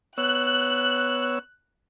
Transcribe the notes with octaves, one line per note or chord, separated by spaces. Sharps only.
B3 C#5 E6 F#6